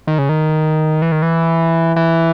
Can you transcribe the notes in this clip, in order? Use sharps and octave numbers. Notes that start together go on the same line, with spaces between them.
D#3
C#3
D#3
E3
D#3
E3
E3